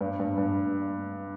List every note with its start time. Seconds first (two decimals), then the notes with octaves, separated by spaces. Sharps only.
0.01 G2
0.20 G2
0.38 G2